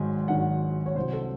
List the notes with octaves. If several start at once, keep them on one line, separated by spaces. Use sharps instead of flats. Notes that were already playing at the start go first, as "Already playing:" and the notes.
Already playing: G#1 G#2 D#3 F#3 G#5
G#1 G#2 D#3 F#3 F#5
C#5
C2 C3 F#3 C5
A4